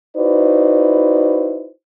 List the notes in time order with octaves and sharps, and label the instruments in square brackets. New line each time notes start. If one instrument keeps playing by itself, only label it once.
[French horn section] D#4 E4 F#4 B4 C5 D5